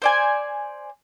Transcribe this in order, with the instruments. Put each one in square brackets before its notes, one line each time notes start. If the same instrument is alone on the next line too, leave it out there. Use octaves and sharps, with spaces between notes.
[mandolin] C5 D5 G#5